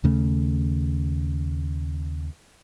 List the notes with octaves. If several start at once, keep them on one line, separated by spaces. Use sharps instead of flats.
D#2 C#3 A3